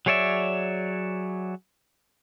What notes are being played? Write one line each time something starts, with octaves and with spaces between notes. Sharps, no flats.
F#3 G#4 C#5 D5 E5